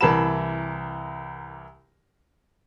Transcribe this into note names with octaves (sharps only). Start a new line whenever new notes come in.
C2 E3 A#4 A5 B5 E7